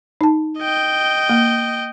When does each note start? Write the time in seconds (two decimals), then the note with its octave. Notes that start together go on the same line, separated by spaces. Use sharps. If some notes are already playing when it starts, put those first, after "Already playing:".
0.21 D#4 A5
0.58 D#5 G5
1.29 A#3